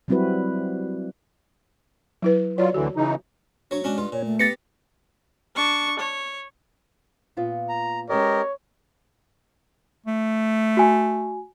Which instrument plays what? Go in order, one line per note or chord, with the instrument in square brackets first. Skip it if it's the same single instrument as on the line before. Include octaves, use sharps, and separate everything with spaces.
[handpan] F#3 G3 C4 E4 F#4 B4
[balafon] F#3 E4 B4
[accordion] F#3 F4 [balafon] C#5 D5
[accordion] D2 D3 E3 [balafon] F#4
[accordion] C#3 E3 D#4
[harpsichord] F#3 C#5 [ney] D4
[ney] G#3 [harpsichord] C#4 D4 F#4
[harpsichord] G2 F4
[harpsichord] A#2 [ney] C#5
[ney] A3
[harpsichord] B3 G4 B5 [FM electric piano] A6 A#6 C#7
[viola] D4 C#6
C#5
[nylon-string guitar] A#2 B3 F4
[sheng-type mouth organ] A#5
[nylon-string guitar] G#3 C#4 B4 [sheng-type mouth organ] G4 A#4 D#5 [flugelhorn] C#5
[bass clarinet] A3
[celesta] F#4 G#5